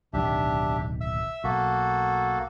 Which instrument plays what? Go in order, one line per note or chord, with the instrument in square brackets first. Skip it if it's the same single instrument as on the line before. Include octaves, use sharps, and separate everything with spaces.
[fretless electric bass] D1 B1 D#3 [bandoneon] D4 G4 E5
[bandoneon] E5 E6
[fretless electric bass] B1 [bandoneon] A#3 F#4 A4